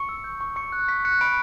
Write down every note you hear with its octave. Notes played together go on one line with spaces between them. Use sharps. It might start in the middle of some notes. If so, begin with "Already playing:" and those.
Already playing: C#6 C#7
E6
G6
C#6
C#6 C#7
F#6
C#6 B6
F#6 C#7
B5 D7